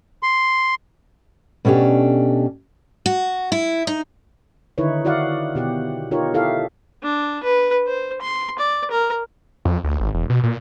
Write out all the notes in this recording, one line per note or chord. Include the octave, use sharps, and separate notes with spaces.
C6
B2 A3 C#4 D4 G4
F#4
E4
D#4
D3 D#3 D#4 E4 B4 C#5
E4 F#4 D5 F5 F#5
B2 G4 F#5
D#4 F4 G4 A#4 C#5
E4 G4 A4 E5 F5
D4
B4
C5
C6
D5
A#4
F2
D2
G#1
E1
B2
A#2